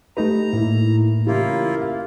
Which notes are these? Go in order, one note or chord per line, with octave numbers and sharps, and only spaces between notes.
A3 D#4 G4 B4 A#5
A2 A#3 E4
C#3 E3 A#3 E4 F4 G4
F5